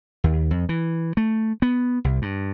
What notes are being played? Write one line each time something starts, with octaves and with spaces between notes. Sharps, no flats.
D#2
F2
E3
A3
B3
C2
G2